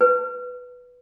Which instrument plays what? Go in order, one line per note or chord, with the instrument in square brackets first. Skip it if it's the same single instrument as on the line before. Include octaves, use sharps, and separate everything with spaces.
[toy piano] B4